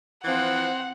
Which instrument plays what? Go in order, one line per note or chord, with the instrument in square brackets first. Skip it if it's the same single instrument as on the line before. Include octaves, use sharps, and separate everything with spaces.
[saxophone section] E3 F3 [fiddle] C4 [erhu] F#5